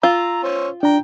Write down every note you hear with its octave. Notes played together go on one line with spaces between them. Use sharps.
F4 A#5 E6
C#4 C5
D4 G5 A#5